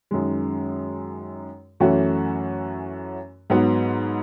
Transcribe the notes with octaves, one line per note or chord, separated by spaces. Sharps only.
F#2 D#3 G#3
F#2 E3 A3 C#4 F#4
G#2 F#3 B3